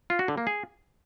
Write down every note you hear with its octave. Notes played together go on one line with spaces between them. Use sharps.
F4
F#4
D3
A#3
G#4